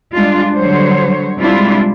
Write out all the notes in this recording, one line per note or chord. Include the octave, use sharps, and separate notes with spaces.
G3 G#3 D4 F4
D3 F#3 G3 C5 C#5
C3 G3 G#3 D4 E4 F4